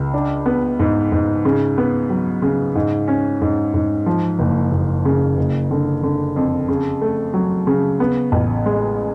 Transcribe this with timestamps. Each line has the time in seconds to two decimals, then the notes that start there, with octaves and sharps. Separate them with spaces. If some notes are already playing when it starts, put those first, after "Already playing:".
Already playing: C#2
0.14 D4
0.46 B3
0.79 G#2
1.12 G#2
1.45 C#3
1.78 B3
2.10 F#3
2.42 C#3
2.75 G#2
3.08 C#4
3.42 G#2
3.74 G#2
4.06 F3
4.39 F#1
4.72 F#1
5.05 C#3
5.37 F#1
5.71 D3
6.03 D3
6.36 F2
6.68 C#3
7.02 A3
7.34 F#3
7.67 C#3
8.00 B3
8.32 A1
8.66 G#3